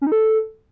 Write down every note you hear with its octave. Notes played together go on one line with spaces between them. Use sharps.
C#4
D#4
A4